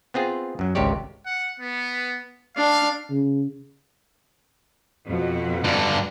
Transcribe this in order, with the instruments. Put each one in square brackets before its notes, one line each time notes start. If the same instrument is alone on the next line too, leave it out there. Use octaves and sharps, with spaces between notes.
[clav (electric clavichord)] B3 C4 F4 G#4
F#2 F#3
G#1 C#2 C3 G4 C#5 D5
[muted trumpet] F#5
B3
[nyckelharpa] D4 [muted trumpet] F5
[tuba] C#3
[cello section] F2 B2 F#4
[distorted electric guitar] G2 D3